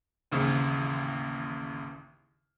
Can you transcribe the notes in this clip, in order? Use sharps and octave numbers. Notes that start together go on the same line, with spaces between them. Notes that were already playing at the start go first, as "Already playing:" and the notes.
A1 D#2 C#3 C4